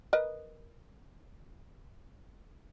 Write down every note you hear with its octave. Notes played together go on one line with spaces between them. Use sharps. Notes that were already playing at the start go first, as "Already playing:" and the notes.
A#4 B4 D#5